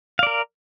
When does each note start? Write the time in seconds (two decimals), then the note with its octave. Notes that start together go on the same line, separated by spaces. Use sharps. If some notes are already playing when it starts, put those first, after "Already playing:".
0.19 F5
0.23 D5
0.27 A#4